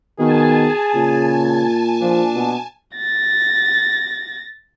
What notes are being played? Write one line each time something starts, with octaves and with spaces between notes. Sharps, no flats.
B2 D#3 G#4 G#5 A5
A#2 C#3
F3 D4
B2
A6 A#6